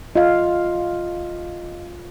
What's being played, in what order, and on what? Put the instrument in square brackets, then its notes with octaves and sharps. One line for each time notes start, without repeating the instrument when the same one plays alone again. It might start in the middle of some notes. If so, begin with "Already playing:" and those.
[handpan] F4 F5 [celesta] D#5